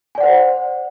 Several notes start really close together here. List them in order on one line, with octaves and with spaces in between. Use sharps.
G#5 D5 F#5 C5